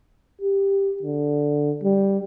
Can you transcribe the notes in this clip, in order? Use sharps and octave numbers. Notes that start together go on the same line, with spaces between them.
G4
D3
G3